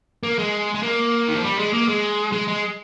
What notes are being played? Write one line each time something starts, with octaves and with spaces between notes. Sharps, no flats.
A#3
G#3
G#3
A#3
D#3
F3
G3
G#3
A#3
G#3
G#3
G#3